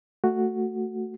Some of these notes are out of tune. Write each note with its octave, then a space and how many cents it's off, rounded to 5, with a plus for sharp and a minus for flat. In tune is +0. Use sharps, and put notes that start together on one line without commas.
A3 +10 F#4 +0